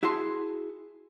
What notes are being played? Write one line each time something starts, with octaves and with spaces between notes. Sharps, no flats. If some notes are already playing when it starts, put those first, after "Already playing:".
E4 F#4 G#4 A5 C6